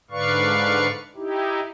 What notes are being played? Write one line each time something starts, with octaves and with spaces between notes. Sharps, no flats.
G#2 D3 B4 D5 F5 C#6
D#4 E4 G4